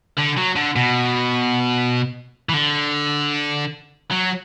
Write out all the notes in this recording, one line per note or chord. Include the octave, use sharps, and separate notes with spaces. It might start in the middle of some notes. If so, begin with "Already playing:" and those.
D3
F#3
D3
B2
E3
D3
F#3